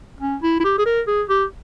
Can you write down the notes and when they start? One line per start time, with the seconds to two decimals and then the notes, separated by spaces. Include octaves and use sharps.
0.21 C#4
0.42 E4
0.60 E4
0.64 G4
0.78 G#4
0.86 A#4
1.07 G#4
1.29 G4